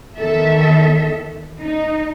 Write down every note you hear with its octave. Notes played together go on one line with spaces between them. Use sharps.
E2 D#3 A4 E5
D#4